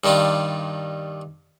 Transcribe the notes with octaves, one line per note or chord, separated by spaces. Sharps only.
G2 D#3 G3 D4 F4